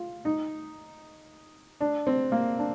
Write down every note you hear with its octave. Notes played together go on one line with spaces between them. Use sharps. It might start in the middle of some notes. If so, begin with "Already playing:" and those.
Already playing: F4
D#4
D4
C4
A#3
D4